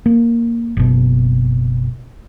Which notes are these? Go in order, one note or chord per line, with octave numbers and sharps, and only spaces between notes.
A#3
F#1 B2